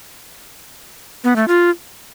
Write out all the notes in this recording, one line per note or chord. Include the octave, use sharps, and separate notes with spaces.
B3
A3
F4